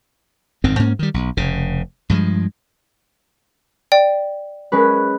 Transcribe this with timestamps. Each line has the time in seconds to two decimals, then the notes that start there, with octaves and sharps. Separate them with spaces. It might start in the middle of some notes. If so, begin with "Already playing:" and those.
0.64 G#1 F#2 D#3 C4
0.79 G#2 A#3 C#4
0.99 D#3 G3
1.14 B1
1.37 F1 C#3
2.10 G2 F3 G3 G#3
3.92 D5 G5
4.72 G#3 C#4 B4